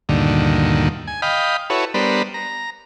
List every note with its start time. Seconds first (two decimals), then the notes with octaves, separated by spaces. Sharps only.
0.09 D2 G2 A#2 D3 D#3
1.07 G#5
1.22 D#5 F5 G5 B5
1.70 E4 F#4 A4 B4 C#5
1.94 G3 B3 D4 A#4 C5 B5
2.34 A#5